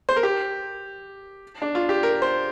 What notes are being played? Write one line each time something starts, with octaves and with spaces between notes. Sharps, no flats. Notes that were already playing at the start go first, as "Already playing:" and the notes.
C5
A#4
G4
D4
F4
G4
A#4
C5